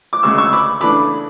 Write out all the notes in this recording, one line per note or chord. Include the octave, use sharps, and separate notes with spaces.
D6
D2 C#3 G#3 C#6 E6
C#6 E6
B5 D6
C#3 E3 A3 D4 B5 D6